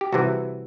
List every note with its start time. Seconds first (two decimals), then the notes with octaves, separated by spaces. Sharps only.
0.01 G4
0.12 C2 C3 E3 F#4